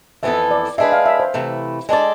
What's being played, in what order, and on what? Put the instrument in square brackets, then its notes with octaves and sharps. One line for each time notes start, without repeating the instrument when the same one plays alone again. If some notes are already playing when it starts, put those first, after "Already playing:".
[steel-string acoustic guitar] F2 E3 B3 E4 A4 [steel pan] E5
[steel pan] D5
[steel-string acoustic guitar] G#3 D4 G#4 B4 [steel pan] E5
[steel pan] F5
E5
C5
[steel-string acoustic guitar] C3 E3 A3 E4
G#3 D4 A4 D5